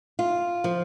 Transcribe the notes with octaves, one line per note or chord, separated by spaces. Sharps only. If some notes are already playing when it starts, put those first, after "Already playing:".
F4
F3